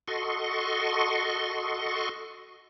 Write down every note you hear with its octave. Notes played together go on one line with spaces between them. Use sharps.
F#4 A4 D#5 C6 C#6